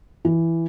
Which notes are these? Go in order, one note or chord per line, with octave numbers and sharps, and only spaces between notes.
E3